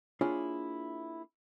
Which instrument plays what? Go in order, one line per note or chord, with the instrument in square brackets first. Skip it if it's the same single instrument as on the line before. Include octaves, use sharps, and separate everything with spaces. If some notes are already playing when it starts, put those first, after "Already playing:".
[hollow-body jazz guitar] A#3 D4 E4 F4 G#4 C#5